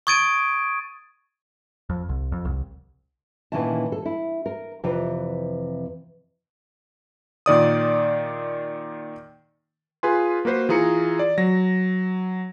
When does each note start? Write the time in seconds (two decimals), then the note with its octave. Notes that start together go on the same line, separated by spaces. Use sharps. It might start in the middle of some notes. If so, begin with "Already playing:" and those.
0.07 C#6 D#6 G#6 A6 D7 D#7
1.90 F2
2.09 C2
2.32 F2
2.45 C2
3.52 A#2 D#3 E3 C#4 E5 A5
3.92 A4
4.06 E4
4.46 A#4
4.84 F2 C3 E3 F4 B4
7.46 A#2 D#3 D5 D#6
10.03 F4 G#4 B4 G#5 C6
10.45 A#3 F#4 B4 C5
10.69 E3 F4 G#4 A#5 C#7
11.19 D5
11.38 F#3 A#6